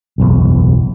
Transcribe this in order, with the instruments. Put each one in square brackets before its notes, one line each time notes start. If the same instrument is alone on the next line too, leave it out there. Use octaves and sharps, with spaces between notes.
[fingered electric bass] F#1 B1 E2